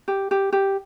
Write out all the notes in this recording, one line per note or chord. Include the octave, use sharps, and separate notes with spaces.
G4
G4
G4